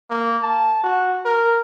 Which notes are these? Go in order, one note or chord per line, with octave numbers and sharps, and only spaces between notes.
A#3
A5
F#4
A#4